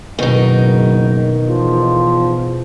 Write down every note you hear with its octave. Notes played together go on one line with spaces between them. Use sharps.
F#1 B2 D#3 D#4
E2 F3